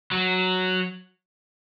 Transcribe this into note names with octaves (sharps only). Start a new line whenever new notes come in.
F#3